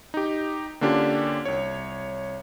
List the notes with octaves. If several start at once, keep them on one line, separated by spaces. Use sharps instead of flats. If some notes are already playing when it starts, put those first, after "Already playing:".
D#4 G4
D3 A#3 C#4 D4 F4 G4
C2 C#5